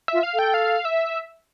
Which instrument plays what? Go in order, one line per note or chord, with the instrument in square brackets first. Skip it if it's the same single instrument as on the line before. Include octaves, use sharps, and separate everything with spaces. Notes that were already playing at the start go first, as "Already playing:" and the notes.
[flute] F4 [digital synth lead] E5
[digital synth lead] F5
[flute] A4 [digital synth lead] G5
[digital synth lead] F5
E5